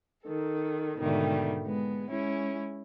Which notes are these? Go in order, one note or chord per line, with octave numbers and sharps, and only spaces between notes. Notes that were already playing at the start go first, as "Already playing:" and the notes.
D#3 A4
G#2 B2 D3 D#3 G3 A3
G#3 B3
G#3 C#4 E4